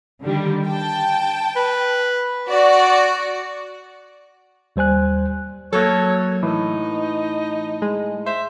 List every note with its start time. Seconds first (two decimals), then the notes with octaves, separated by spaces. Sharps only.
0.23 D3 D#3 G3
0.66 G5 A5
1.56 B4
2.48 F#4 D5
4.76 D#2 G3 C5 G#5 F#6
5.73 F#3 A#3 A4 C#5
6.43 A2 E3 D#4
7.82 G#3
8.26 C5 E5